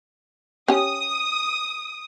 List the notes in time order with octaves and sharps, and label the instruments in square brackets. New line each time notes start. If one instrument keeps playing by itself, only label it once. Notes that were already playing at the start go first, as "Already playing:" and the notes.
[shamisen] C#4 G4 [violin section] D#6